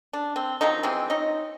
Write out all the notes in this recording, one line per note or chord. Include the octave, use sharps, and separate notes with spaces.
D4
C4
D#3 F3 F#3 D#4
E3 F3 G#3 C4
D#4 C#5 D#5